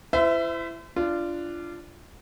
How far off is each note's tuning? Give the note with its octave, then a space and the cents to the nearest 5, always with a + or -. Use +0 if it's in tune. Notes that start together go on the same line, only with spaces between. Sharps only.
E4 +30 C5 -40 E5 +5
D4 +0 F4 -25